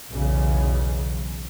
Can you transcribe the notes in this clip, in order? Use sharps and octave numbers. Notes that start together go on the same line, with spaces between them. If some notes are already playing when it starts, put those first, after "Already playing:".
B1 E2 C#3